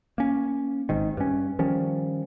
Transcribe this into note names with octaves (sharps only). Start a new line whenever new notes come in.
A#3 C#4
G#1 G#2 D#3
G2 C#4
D#3 F3 G3 C#4